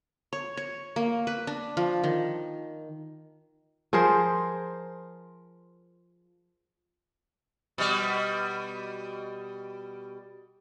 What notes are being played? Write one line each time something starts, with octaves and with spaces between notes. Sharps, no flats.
C#5
C#5
A#3
B4
D4
F3
D#3
F3 G#4 A#4 C5
B2 G3